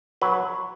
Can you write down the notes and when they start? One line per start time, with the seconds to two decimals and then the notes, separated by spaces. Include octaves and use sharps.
0.22 F#3 B4